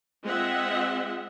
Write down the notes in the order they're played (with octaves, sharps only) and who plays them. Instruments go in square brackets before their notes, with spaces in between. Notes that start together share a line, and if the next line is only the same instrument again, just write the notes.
[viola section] G#3 C4 F4 D#5 E5 F#5